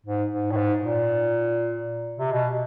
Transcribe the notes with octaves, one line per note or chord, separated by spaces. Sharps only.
G#2
G#2
A2
G#2
A#2
C3
B2